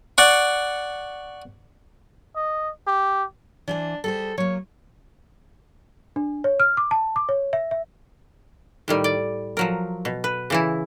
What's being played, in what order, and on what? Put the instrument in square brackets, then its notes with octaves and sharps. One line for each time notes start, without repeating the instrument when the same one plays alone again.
[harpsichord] D5 F#5 C#6
[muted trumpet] D#5
G4
[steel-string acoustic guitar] E3 C5 G#5 [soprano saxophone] D4
[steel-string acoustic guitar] G3 G#4 C5 [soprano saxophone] A4
[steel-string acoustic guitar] F#3 A#3 [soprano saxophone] C#5
[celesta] D4
C#5
F6
D6
A5
D6
C#5
E5
E5
[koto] A2 D#3 G3
D5
F3 F#3 A#4
B2
B4
C#3 E3 E4